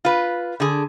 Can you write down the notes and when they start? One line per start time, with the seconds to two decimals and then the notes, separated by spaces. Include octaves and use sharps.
0.05 F4 B4
0.60 D3 G#4